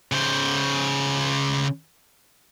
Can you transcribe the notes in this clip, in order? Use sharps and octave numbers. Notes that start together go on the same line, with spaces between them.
C#3 C5